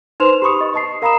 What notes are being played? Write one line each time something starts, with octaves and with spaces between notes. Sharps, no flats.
D#4 B4 C5 C6 E7 F7
G4 B5 C#6 D#6 C#7
D#5
D#5 A5 C7
A#4 F5 A#5 B5 D#6 E7